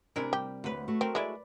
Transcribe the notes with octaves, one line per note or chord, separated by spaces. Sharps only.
C3 D4 E4 A#4 G#5
G3 G4
D2 F#3 B4
A3 F#4
C4 A#4
G#3 E4 B4 D5